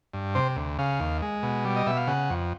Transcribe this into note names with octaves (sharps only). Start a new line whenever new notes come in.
G2
C3 C5
D2
C#3 F5
D#2
G#3
B2
G3
D#5
B2 E5
F5
C#3 F#5
F2